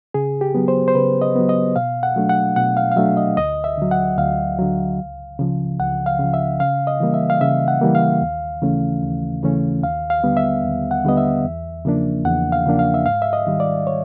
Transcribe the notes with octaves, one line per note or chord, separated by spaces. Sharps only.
C#3 G#4
G4
F#3 B3
C5
C5
C#3 B4
D#5
F#3 B3
D#5
B2 F5
F#5
F#3 A3 D4
F#5
B2 F#5
F5
F5
F#3 A3 D4 E5
D#5
D2 D#5
E5
D3 F#3
F#5
D2 F5
D3 F#3
C#2
C#3 F3
C#2 F#5
F5
C#3 F3
E5
C#3 F5
D#5
E3 G3 A#3
E5
F5
C#3 E5
F#5
E3 G3 A#3
F5
D#2
C#3 E3 A3 C#4
D#2
C#3 E3 A3 C#4
D#2 F5
F5
D3 G3 B3
E5
D#2
F#5
D3 G3 B3 D#5
E5
E2
C#3 F3 A#3 D4
E2 F#5
F5
C#3 F3 A#3 D4
F5
E5
G#2 F5
E5
D#5
D#3 G3
D5
C#5